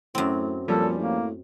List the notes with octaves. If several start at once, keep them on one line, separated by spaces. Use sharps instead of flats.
F#2 A2 C4
A#2 F3 G3 C#4 A4
A2 A#3